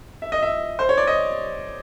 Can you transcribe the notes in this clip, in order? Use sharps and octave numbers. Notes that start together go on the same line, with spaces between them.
E5
D#5
E5
C5
C#5
D5
D#5